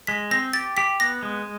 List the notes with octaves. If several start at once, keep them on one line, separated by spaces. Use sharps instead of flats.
G#3 B6
C4 A#6
G4 A6
G4 B6
B3 A#6
G#3